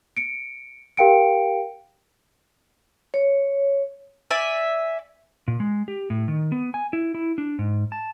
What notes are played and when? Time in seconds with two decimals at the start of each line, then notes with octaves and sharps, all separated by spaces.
0.17 C#7 D7
0.97 G4 A#4 F5 G5 C#7 D7
3.14 C#5
4.31 D5 E5 G#5
5.48 A#2
5.60 G#3
5.88 G4
6.10 A2
6.28 D#3
6.52 B3
6.74 G#5
6.93 E4
7.15 E4
7.38 D4
7.59 G#2
7.92 A5